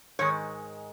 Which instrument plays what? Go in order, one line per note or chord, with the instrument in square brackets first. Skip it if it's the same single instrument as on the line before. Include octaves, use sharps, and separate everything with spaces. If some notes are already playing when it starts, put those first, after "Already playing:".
[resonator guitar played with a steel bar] G#2 D#3 G#3 C#5